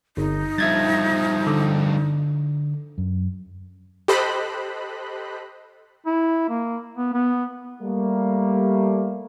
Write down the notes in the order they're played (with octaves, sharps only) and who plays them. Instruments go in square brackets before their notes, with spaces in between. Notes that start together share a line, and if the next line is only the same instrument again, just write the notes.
[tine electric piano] G1 [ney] D#4
[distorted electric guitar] G2 F3 [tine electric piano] E5 G#6 A6
[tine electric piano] D3
[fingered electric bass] F#2
[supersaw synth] G4 A4 C5 D#5 B5 F#6
[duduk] E4
A#3
B3
B3
[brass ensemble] G3 A3 A#3